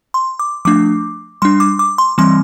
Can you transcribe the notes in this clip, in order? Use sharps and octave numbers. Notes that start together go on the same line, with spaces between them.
C6
D6
F3 A3 D4 D6
G3 D4 C6
D6
D6
C6
E3 G3 C4 C6